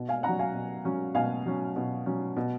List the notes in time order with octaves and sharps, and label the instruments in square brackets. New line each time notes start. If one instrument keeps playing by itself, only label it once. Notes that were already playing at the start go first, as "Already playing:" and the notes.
Already playing: [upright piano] B2
F5 G#5
C#4 F#5 A#5
F#3
F5 G#5
B2
F#3 C#4
B2 F5 G#5
F#3 C#4
B2
F#3 C#4
B2